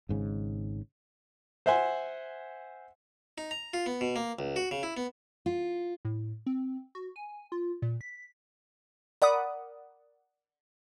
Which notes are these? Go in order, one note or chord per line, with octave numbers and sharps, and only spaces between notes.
G#1 G#2 C#3
C5 E5 F#5 G#5
D#4
A#5
F4
B3
B2
A#3
C#2
F#4
C#3
E4
B3
F4
A2
C4
F#4
G#5
F4
A#2
B6
A#4 D5 F#5 B5 D#6